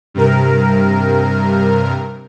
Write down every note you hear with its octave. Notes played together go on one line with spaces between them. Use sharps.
G2 C3 A#4